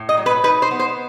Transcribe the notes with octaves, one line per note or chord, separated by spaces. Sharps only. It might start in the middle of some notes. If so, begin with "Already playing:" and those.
Already playing: A2
D#5
F#3
B4
D#4 B4
C5
B3
C5